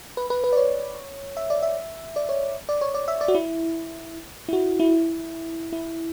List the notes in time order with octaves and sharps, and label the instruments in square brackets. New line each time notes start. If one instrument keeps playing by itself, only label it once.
[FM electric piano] B4
B4
B4
D5
C#5
E5
D5
E5
D5
C#5
D5
C#5
D5
E5
D5
F#4
E4
E4
F#4
E4
E4